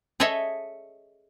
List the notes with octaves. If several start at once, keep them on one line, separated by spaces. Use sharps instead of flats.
G#4 A4 C#5 D#5 E5